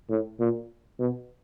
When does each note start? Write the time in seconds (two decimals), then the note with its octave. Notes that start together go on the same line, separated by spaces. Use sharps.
0.10 A2
0.40 A#2
0.99 B2